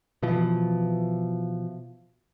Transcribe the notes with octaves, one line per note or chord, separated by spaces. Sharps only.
B2 E3 F3